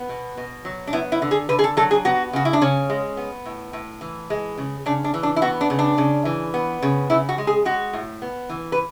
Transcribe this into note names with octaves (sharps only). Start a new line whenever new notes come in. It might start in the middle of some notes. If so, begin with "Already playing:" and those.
Already playing: B3
B2
B2
F#3
D4
B3 E4
E4
D3
G#4
D3 B4
G#4
A4
F#3 A4
G#4
B3 F#4
C#3 F#4
E4
D4
C#3 C#4
G#3
B3
A2
A2
E3
G#3
C#3
C#3 D4
D4
E3
D4
E4
B3 F#4
D4
C#3
D4
C#3
E3
B3
C#3
C#3 E4
F#4
G#3
G#4
G#3 F#4
A2
B3
E3
B4